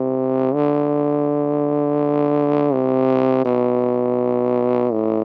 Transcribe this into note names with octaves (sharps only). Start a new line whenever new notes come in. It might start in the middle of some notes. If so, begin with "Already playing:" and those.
Already playing: C3
D3
C3
B2
A2